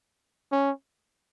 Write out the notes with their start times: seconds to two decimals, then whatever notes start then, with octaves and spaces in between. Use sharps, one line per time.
0.52 C#4